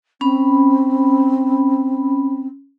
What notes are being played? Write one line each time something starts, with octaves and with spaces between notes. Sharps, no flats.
C4 C#4 B5